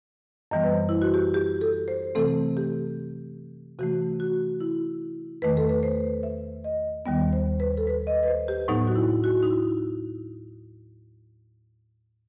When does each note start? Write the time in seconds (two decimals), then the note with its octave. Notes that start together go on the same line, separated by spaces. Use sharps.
0.51 F#2 E3 G3 B3 D#5
0.64 B4
0.73 C5
0.89 E4
1.02 F#4
1.14 G4
1.34 G4
1.61 A4
1.88 C5
2.15 C3 E3 A3 C4 A4
2.57 G4
3.79 C3 E3 A3 F#4
4.20 F#4
4.60 E4
5.42 E2 D#3 A3 B4
5.57 A4
5.69 B4
5.83 C5
6.23 E5
6.64 D#5
7.06 D#2 D#3 G3 B3
7.33 C5
7.60 B4
7.77 A4
7.87 B4
8.07 D#5
8.23 B4
8.28 C5
8.48 G4
8.68 A2 F#3 B3 D#4
8.87 F#4
8.96 E4
9.24 F#4
9.43 D#4
9.51 E4